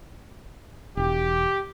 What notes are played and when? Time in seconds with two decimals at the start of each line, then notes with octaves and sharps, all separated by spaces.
0.97 E1 G4